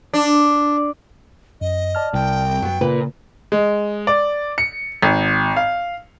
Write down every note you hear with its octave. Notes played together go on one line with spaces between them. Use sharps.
D4
F#2 D#5
D5 A5 F6
C2 G5
F#2 F#3 B3
A#2 C#3 B4
G#3
D5
C#7
G#1
F5